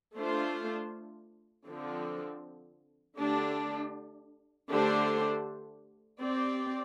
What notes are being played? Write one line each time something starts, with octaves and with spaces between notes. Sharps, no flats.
A3 D4 F4 C5
D3 F3 C4
D3 A3 D4 G4
D3 A3 D4 G4 C5
C4 G4 D5